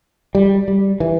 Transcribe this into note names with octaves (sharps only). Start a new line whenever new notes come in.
G3
G3
E3